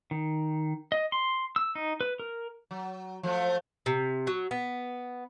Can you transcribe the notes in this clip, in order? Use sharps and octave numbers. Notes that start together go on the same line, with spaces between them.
D#3
D#5
C6
E6
D#4
B4
A#4
F#3
F3 F#3 A3
C3
F#3
B3